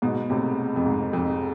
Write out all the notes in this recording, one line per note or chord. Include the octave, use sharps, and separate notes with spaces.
G#2 B2
A2 C3
F2
G#2
F2